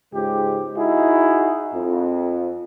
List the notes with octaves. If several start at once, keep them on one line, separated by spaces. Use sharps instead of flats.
C#2 G#2 G#3 G4
D#4 E4 F#4 G#4
F2